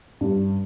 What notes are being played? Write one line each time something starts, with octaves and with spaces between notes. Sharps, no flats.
G2